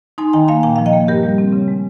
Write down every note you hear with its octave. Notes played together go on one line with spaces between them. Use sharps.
D#4 G#5 C6
D#3 G5 A#5
A#3 F5 G#5
A#2 G5 A#5
F3 F5
D#5 G5
A#3
G2 G4 A#4
G3
C4
C#3
G#3